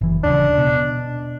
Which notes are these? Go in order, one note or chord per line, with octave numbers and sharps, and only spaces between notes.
F#1 E3
D#1 C#3 D4
B2